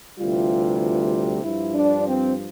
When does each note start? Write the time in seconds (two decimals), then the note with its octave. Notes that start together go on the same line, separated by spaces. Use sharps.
0.19 D2 C3 E3 G3 F4
1.43 G2 F3 E4
1.75 D4
2.06 C4